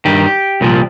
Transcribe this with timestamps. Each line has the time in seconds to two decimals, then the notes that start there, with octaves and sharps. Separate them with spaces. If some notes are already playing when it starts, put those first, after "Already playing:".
0.05 G2 D#3 G4
0.61 C2 A#2 F3